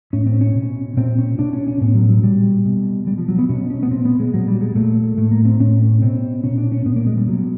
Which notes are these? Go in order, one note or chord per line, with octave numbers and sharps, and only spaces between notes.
A2 C#4
C4
C#4
B2
A#2 C4
C#4
B2 D4
C#4
C#4
A2 B3
F#3
F#3
A#2 G3
B2
B2 G3
F3
F#3
B3
B2 C#4
C#4
B3
A#2 C4
B3
G#3
A#2 F#3
G3
G#3
A#2 A3
A2 A3
A#3
C4
A2 C#4
B2 C4
A#2 C#4
D4
C#4
A#2 B3
A#3
G#3
G3
B2 F#3